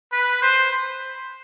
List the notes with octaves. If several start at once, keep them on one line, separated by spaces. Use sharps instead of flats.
B4
C5